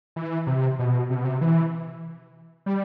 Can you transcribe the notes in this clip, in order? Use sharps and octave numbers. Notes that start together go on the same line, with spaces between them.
E3
C3
B2
C3
B2
C3
E3
G3